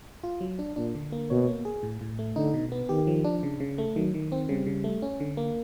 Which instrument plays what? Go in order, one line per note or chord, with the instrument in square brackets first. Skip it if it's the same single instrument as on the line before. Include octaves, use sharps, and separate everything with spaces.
[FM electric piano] F4
F#3
D4
[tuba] A#2 [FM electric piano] D4
[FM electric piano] D3
A#3
[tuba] B2 [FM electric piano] C#5
[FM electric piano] A#3
G#4
A2
A2
A3
[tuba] D3 [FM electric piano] D#4
[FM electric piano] B2
B3
[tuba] D#3 [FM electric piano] G4
[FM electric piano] F3
D4
C#3
C#3
A3
[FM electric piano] D#3 [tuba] F#3
[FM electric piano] D#3
C4
[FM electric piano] C#3 [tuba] G3
[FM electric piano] C#3
A3
C#4
D3
A#3